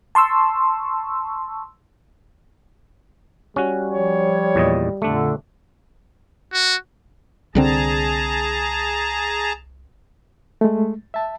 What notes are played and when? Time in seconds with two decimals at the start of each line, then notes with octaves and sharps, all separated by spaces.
0.15 A5 C6 C#6 E6
3.56 G3 C#4 F#4
3.90 F3 C#5
4.55 E2 A#2 D#5
5.02 F2 A#2 D3 A3 D4
6.53 F#4
7.55 C2 D3 C4 G#4 A5 A#5
10.61 G#3 A3
11.14 E5 A5